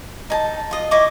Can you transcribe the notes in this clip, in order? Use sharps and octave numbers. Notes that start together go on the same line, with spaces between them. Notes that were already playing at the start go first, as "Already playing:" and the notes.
D#4 G#5 A5
F4 D#5
E4 D#5 C#6 D6